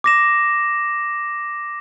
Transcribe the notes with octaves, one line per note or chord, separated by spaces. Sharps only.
D6 A#6 E7